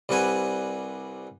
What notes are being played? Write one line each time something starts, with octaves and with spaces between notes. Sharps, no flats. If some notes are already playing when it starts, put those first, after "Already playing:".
C2 G3 C4 B4 F#5 G#5